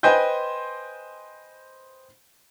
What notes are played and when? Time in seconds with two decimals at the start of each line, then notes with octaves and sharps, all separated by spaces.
0.03 B4 C5 D#5 G5 G#5 G6